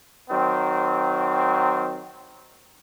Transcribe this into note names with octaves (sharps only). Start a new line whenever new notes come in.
D#3 F#3 C4